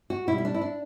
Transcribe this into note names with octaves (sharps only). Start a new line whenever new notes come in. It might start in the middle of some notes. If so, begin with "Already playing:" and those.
F#4
B2 E4
G3
E4
D4
E4
D4